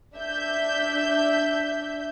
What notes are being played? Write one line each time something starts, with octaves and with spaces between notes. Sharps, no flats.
D4 E5 G6